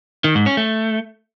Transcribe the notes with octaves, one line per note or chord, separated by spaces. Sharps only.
D#3
G#2
C#4
A3